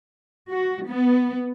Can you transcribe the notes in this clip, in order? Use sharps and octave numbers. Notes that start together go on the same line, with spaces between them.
F#4
B3